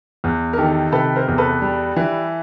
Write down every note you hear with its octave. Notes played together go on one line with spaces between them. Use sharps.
E2
A#4
D#3 G4 A4
C3 A4 B4
A#4 C5
E2
A4 B4
G3
E3